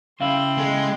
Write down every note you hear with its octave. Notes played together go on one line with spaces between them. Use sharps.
C#3 E4 F5 G5 C6
G#3 A4